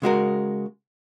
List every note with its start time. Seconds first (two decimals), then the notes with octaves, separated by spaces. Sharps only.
0.02 C#3 G#3 F#4 A#4